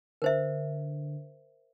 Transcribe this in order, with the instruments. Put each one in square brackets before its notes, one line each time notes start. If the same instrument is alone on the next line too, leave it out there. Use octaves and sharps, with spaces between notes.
[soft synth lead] D3 [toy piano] A#4 C5 E5